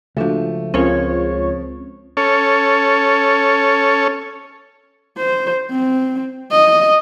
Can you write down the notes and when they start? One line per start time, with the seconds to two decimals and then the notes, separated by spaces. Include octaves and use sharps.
0.17 C#2 F3 G#3 A3 D4 F#4
0.74 C#2 F3 C4 C#4 F4 A#4 C#5
2.17 C#4 A4 C#5
5.17 C5
5.71 C4
6.51 D#5